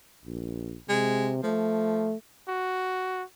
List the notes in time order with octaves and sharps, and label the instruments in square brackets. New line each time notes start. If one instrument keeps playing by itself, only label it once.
[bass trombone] A#1
[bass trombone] C3 [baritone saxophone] G#3
[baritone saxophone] F3 [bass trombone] A3
[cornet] F#4